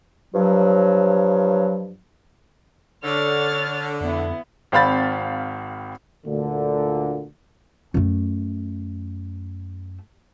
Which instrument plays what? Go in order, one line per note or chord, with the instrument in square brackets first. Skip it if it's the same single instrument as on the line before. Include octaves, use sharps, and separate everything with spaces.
[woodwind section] G2 F3 F#3
[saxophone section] D3 [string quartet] C#5 F6 A6
[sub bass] F2 [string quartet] B3 E4
[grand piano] G#1 C4 F5 B5 A6
[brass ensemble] D2 A#2 D3
[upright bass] F#2 A3